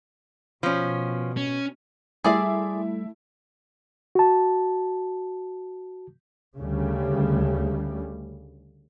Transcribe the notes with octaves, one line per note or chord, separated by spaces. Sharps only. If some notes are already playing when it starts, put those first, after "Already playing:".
B2 F3 C#4
C#4
G3 A3 E4 G#4 D5 E5 C6
F#4 A5
D2 C#3 G3